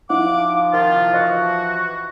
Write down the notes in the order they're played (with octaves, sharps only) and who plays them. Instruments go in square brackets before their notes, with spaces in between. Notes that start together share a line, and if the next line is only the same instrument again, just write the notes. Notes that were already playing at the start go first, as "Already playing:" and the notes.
[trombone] F3 [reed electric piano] D#4 E4 [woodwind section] F5 F#5 D6
[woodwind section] C3 D#3 F4
[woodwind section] E3 F#4 [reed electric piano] D#5